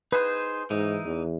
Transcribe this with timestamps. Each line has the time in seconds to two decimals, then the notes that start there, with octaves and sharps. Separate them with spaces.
0.12 D#4 G#4 B4 C5
0.70 G#2 E3 D#4
1.05 E2